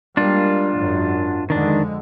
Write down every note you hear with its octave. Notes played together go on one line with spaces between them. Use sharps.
G3 G#3 A#3 D4 F4
G#1 F#2 F#3
F2 D3 D#3 G#3 D4